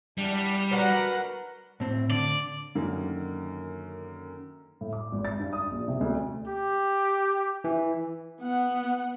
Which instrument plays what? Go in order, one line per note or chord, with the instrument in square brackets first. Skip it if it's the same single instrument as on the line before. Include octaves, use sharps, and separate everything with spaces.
[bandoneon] E2 D4 [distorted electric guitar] G3
[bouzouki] D4 F#4 [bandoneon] A#4 B4 [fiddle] F#5 A#5
[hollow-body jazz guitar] A2 C4
[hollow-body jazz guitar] D3 [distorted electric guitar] D5
[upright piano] F#2 D3 D#3 A#3
A2
D6
G#1
A6
G2
D#6
A#1
C3
D2
[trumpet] G4
[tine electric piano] E3
[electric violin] B3 F#5